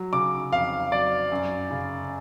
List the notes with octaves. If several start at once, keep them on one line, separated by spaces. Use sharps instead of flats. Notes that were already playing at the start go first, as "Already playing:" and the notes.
Already playing: F#3
C#3 D6
F2 F5
F#3 D5
F#2
C#3